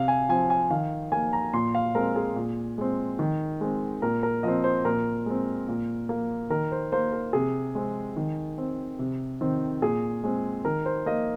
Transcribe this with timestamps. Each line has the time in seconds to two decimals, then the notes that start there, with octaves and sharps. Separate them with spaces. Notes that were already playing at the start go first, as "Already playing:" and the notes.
Already playing: C3 F5
0.08 G#5
0.29 F3 C4 G#5
0.50 G#5
0.70 D#3 F5
1.12 A#3 G#5
1.33 A#5
1.53 A#2 C6
1.75 F5
1.95 G#3 C4 A#4
2.16 G#4
2.36 A#2
2.78 G#3 C4
3.19 D#3
3.61 G#3 C4
4.02 A#2 A#4
4.23 A#4
4.43 F3 C4 D#5
4.64 C5
4.85 A#2 A#4
5.26 G#3 C4
5.68 A#2
6.09 A#3
6.50 D#3 A#4
6.72 C5
6.92 A#3 C5
7.13 A#4
7.33 C3 G#4
7.75 G#3 C4
8.17 D#3
8.58 C4
8.99 C3
9.41 D#3 C4
9.82 A#2 G#4
10.24 G#3 C4
10.65 D#3 A#4
10.86 C5
11.06 A#3 D#5